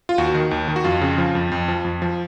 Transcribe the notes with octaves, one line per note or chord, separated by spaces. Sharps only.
F4
D#2 F#4
D#3
D#2
D#3
F#4
F2 F4
C#3
F3
F2
F2
F3
F2
F3